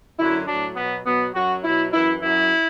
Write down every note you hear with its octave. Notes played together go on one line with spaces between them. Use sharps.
F#2 D3 F#3 E4
A2 F#3 D4
B2 B3
F#3
B2 F#3 B3
F#2 F#3 F#4
B2 F#3 E4
F#2 E3 E4
F#2 F#3 E4